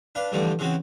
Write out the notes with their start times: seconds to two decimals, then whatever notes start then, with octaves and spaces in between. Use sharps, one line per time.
0.15 D4 B4 F5
0.32 G2 D3 E3 F3 G3 A3
0.59 C#3 E3 C4 C#4 F#4